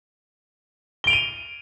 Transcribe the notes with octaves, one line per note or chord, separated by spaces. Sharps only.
D7 D#7 F7 G7